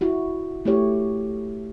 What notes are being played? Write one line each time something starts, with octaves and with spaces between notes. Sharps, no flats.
E4 F#4
A3 E4 G4 C#5